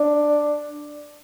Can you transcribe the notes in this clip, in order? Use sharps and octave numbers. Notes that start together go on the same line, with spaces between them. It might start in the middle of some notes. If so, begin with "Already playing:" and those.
Already playing: D4